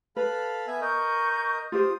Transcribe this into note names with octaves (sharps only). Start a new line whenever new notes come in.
A4 B4 F5 B5
B3 E5 G#5
A#4 D#5 C#6 G6
F4 G4 C5 D#6